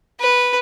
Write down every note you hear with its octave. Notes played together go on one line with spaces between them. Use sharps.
B4